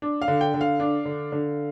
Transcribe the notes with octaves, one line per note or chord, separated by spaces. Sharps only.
D4
F5
D3
G5
D3
F5
D4
D3
D3